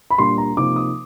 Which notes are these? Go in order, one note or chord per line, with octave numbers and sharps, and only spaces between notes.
B5
A#2 G3 A#3 D4 C6
A#5
C3 F3 A#3 D#4 D6
D#6